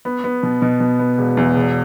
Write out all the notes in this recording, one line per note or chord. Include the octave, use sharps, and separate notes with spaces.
B3
B3
B2
B2
B2
B3
E1
E2
E1